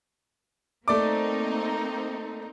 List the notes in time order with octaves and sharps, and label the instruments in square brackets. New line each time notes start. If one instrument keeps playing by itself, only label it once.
[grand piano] A3 D5 D6 [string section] A#3 C4 D#4